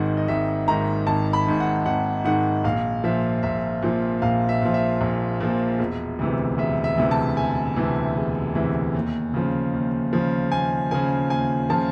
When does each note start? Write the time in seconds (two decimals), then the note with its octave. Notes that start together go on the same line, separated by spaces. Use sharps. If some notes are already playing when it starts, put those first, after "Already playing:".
Already playing: G#1 G#2 D#3 F#5
0.17 D#5
0.28 G#1 E5
0.68 G#2 D#3 A#5
1.07 G#1 A5
1.33 B5
1.47 G#2 D#3
1.60 F#5
1.86 G#1 F#5
2.25 G#2 D#3 F#5
2.64 A#1 F5
3.04 A#2 F3 E5
3.43 A#1 E5
3.82 A#2 F3
4.22 A#1 F5
4.49 E5
4.62 A#2 F3
4.74 E5
5.01 A#1
5.40 A#2 F3
5.79 E1
6.19 D2 C3 E3
6.58 E1 E5
6.84 E5
6.98 D2 C3 E3
7.11 A5
7.37 E1 G#5
7.76 D2 C3 E3
8.16 E1
8.55 D2 C3 E3
8.94 D#2
9.34 C#3 F3
9.73 D#2
10.13 C#3 F3
10.52 D#2 G#5
10.91 C#3 F3 G#5
11.30 D#2 G#5
11.70 C#3 F3 A5